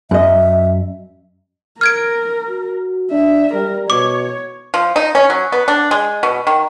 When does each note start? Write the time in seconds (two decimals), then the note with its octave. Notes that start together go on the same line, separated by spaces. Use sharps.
0.11 F#2 D#5 E5
1.81 A#4 F6 G#6 D7
2.49 F#4
3.11 D4 E5
3.54 G3 A#4
3.90 B2 C#5 D6
4.74 F3
4.96 D#4
5.15 C#4
5.30 F#3
5.52 B3
5.68 D4
5.91 G#3
6.23 B2
6.47 D#3